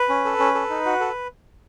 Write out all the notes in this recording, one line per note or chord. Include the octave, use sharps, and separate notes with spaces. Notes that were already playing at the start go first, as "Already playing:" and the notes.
Already playing: B4
C#4
A4
C#4
A4
D#4
F#4
A4